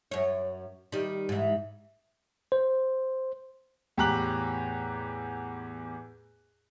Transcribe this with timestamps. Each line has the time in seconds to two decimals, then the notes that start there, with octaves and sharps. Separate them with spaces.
0.11 F#2 C#5
0.92 D#3 G3
1.29 G#2 E3
2.52 C5
3.97 E2 A2 G4 A#5 F#6 F#7